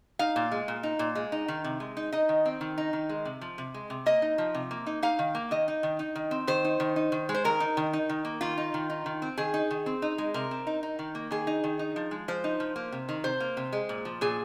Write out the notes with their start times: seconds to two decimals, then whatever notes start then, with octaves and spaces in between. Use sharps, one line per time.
0.19 D#4 F5
0.36 A#2
0.52 G#3
0.68 A#2
0.83 D#4
0.99 A#2
1.15 G#3
1.32 D#4
1.48 D#3
1.64 C3
1.80 G#3
1.97 D#4
2.12 D#4 D#5
2.29 D#3
2.45 C4
2.61 D#3
2.78 D#4
2.93 D#3
3.09 G#3
3.25 C3
3.41 F3
3.58 C3
3.74 G#3
3.90 C3
4.06 A#3 D#5
4.22 D#4
4.38 F3
4.54 C3
4.71 A#3
4.86 D#4
5.03 D#4 F5
5.19 D#3
5.35 A#3
5.51 D#3 D#5
5.68 D#4
5.83 D#3
5.99 D#4
6.16 D#3
6.31 C4
6.47 D#3 C5
6.64 D#4
6.80 D#3
6.96 D#4
7.12 D#3
7.29 G#3
7.34 C5
7.44 D#3 A#4
7.60 D#4
7.77 D#3
7.93 D#4
8.09 D#3
8.25 A#3
8.41 D#3 F4
8.58 D#4
8.74 D#3
8.90 D#4
9.06 D#3
9.22 C4
9.38 D#3 G#4
9.54 D#4
9.71 D#3
9.86 C4
10.02 D#4
10.18 G#3
10.34 C3 A#4
10.51 C4
10.67 D#4
10.83 D#4
10.99 D#3
11.15 A#3
11.31 D#3 G#4
11.47 D#4
11.64 D#3
11.79 D#4
11.96 F3
12.11 G#3
12.28 F3 C5
12.44 D#4
12.60 F3
12.76 A#3
12.92 C3
13.09 D#3
13.24 C3 C5
13.40 A#3
13.57 C3
13.72 G#3
13.89 A#2
14.05 F3
14.21 A#2 G#4